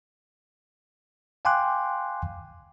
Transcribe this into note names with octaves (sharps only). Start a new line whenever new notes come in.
F5 G5 G#5 C6 D6 F#6